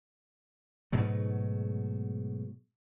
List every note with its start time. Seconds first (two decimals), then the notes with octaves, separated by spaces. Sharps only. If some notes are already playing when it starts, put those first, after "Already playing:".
0.92 G#2 B2 F#3 A3